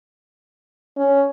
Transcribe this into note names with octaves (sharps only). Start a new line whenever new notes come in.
C#4